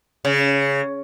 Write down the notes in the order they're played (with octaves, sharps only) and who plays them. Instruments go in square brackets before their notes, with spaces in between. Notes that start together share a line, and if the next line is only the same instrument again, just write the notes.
[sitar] C#3